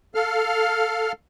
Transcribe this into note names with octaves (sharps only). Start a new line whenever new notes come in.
A4 F5 F6